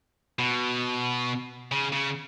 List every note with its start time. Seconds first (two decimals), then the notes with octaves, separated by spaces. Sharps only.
0.39 B2
1.72 C#3
1.93 C#3